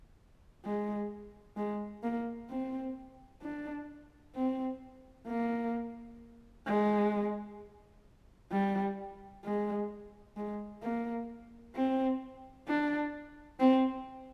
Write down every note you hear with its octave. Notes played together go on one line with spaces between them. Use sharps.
G#3
G#3
A#3
C4
D4
C4
A#3
G#3
G3
G#3
G#3
A#3
C4
D4
C4